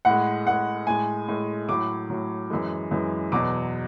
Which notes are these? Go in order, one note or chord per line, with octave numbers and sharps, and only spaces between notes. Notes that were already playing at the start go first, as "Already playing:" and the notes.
A2 G#3 F#5
A2 G#3 F#5
A2 G#3 G#5
A2 G#3
A2 F#3 D6
A2 F#3
F#2 E3 G#3
F#2 E3 G#3
E2 B2 F#3 D6